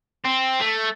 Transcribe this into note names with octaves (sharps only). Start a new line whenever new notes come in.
C4
A3